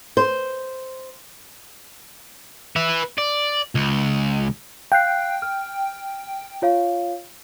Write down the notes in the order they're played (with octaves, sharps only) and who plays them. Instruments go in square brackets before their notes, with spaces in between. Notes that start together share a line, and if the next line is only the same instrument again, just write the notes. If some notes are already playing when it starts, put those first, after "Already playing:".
[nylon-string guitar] C5
[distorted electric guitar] B4 E5
D5
C#2
[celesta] F5 F#6 C7 [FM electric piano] G5
[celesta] F6
F4 C#5 F5